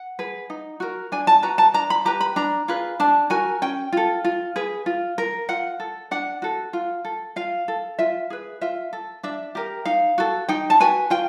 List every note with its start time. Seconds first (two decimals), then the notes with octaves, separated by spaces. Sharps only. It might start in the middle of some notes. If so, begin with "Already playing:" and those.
Already playing: F#5
0.19 G#4 B4
0.50 D#4
0.80 F#4 A#4
1.12 D4 G#5
1.27 A5
1.42 F#4 B4 A#5
1.58 A5
1.74 D4 A#5
1.90 B5
2.05 G4 B4 A#5
2.21 B5
2.36 D4 A#5
2.68 F4 G#4 B4
3.00 D4 A5
3.30 F#4 A#4 G#5
3.62 C#4 G5
3.92 F4 A4
4.24 F4
4.56 G#4 B4
4.86 F4
5.18 A#4
5.49 F4 F#5
5.80 A4
6.11 D4 F#5
6.42 F#4 A4
6.73 F4
7.05 A4
7.36 F4 F5
7.68 A4
7.99 F4 E5
8.30 G#4 B4
8.61 F4 E5
8.93 A4
9.23 D4 E5
9.55 G4 A#4
9.85 D#4 F5
10.18 F#4 A4
10.49 D#4 G5
10.70 A5
10.80 F#4 B4 G#5
11.10 F4 G5